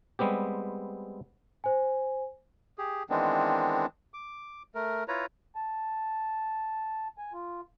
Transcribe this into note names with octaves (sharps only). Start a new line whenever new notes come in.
G3 G#3 B3 C4 G4
C5 G#5
G4 G#4
D#3 E3 G#3 B3 C4 D4
D6
A3 A#4
E4 F4 B4 C#5 A#5
A5
G#5
F4